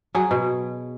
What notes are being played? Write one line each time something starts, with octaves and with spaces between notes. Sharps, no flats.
F#3 G#4
B2